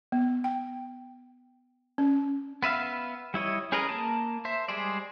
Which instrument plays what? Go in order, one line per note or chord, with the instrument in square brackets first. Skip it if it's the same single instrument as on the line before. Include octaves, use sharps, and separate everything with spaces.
[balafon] B3
G5
C#4
[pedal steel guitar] B3 B4 E5 F5
G3 E4 C#5 D#5
C#4 G#4 A#4 B4 D#5
A#3 A5
C5 E5
G3 G#3 G#4 C5 D5